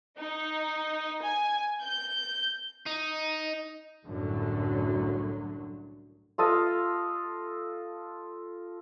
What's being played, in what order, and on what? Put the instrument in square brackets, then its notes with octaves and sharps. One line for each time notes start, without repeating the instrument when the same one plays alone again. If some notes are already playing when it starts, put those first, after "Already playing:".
[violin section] D#4
G#5
G6
[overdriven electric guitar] D#4
[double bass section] C2 F#2 A2 D3 F#3
[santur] F4 A4 D#5 F5